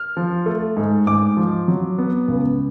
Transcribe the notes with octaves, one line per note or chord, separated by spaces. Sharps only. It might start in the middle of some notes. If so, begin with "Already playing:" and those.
Already playing: F6
F3
A3
G#2
G#2 D6
F3
F#3
B3
C#2